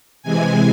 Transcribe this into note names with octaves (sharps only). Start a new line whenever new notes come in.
C3 E3 G#3 G#5